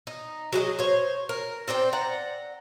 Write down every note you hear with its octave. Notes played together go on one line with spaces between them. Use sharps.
D#4
F#3 G#4 B4 D#5
C5 C#5
A#4
C4 C5 D5 G5
D5 F#5 A#5